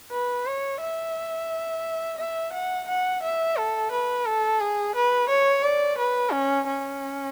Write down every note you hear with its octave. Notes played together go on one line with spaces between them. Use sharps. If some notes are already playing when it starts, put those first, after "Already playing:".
B4
C#5
E5
E5
F#5
F#5
E5
A4
B4
A4
G#4
B4
C#5
D5
B4
C#4
C#4